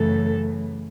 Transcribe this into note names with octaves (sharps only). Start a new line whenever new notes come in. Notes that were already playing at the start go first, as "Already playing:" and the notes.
Already playing: F#2 C#3 E3 A3 A4